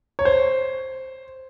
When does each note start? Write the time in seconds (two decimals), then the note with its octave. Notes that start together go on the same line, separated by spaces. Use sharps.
0.19 C#5
0.25 C5